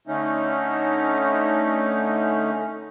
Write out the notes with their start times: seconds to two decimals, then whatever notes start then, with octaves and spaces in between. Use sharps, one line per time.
0.07 D3 A3 C#4 D#4